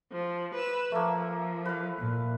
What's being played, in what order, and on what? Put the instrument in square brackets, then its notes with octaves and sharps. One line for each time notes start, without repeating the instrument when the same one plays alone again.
[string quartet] F3
B4 E6
[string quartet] F3 [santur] A3 A#3
[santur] B4 F5
[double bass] A#2